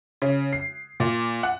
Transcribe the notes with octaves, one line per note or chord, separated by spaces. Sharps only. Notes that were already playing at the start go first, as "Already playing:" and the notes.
C#3
C7
A#2
F#5